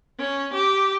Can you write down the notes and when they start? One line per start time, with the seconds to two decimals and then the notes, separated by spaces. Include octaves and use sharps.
0.19 C#4
0.54 G4